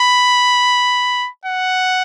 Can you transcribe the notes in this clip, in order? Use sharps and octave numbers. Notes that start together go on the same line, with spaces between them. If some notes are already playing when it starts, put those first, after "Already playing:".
Already playing: B5
F#5